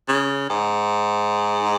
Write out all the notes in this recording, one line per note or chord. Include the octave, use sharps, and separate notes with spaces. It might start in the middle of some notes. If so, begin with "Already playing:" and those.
C#3
G#2